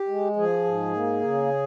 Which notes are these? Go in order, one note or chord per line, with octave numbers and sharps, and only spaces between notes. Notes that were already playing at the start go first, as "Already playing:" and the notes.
Already playing: G4
G#3
F3 G#4
G#2
A#3
C#3